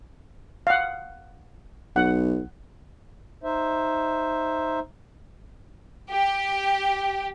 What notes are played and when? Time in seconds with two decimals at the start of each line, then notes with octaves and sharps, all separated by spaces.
0.67 F5 F#5
1.96 B1 F#5
3.44 D#4 C5 E5
6.10 G4